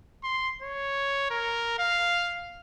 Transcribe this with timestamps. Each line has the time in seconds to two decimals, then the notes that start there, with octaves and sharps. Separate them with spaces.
0.24 C6
0.62 C#5
1.30 A#4
1.79 F5